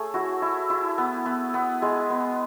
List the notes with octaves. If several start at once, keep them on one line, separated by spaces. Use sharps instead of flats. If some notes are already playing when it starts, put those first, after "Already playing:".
Already playing: A3 G#4 C#5
E4 F#4
E4
E4
B3
B3
B3
G#3 G#4
B3